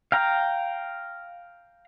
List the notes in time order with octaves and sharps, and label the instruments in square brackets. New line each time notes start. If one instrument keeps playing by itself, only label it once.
[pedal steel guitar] F5 G5 A#5